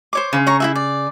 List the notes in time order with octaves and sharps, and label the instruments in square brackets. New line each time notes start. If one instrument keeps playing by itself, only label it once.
[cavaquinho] C5 C#5 D6
[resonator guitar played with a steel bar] C#3
[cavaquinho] C#5 A#5 C#6
E4 F#4 E5
D5